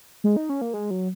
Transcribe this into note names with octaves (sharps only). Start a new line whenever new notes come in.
G#3
D#4
C#4
A#3
G#3
F#3